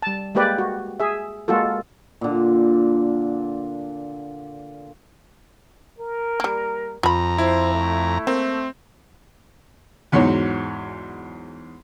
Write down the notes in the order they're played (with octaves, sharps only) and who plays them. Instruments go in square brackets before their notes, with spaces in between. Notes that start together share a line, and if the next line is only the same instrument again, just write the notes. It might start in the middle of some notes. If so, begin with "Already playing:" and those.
[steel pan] G3 A5
G#3 A#3 G4 B4 D5
F#4
G#4 E5
G#3 A#3 F4 F#4 A4
[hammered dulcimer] A#2 D3
[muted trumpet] A#4
[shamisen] G3 A#3
[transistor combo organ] F2 A#5 [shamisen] F4 B5
[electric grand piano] E4 [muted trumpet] C5
[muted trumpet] A3
[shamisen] A#3 [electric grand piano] C4
[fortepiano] E2 G#2 F#3 F#4 C#5